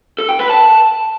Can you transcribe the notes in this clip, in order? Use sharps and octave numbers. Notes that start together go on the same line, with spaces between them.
A4
G5
B4
A5